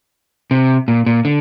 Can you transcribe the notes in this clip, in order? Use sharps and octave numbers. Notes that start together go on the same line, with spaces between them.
C3
A#2
A#2
D3